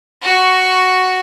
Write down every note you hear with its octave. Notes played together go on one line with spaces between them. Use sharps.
F#4 C#6